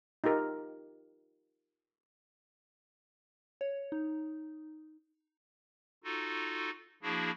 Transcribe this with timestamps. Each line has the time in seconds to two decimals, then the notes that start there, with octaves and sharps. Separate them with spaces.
0.24 D#4 F4 G4 A#4
3.61 C#5
3.92 D#4
6.04 D#4 F4 F#4 A4
7.03 F3 A#3 D4 E4 F#4 G#4